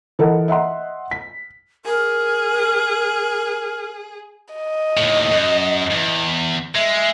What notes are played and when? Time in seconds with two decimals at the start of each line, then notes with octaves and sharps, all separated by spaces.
0.19 E3 A4 A#4 D#5 F#5
0.48 D#5 E5 F#5 C6
1.11 B6
1.85 G#4 A#4
4.55 D#5
4.97 D#2 A2
5.32 F#2
5.91 E2 G#2
6.75 G#3 E5